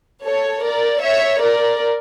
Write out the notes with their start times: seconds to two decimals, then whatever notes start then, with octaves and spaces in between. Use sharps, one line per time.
0.24 A4 C#5
0.63 A#4 D5
1.02 C#5 E5
1.42 A#4 D5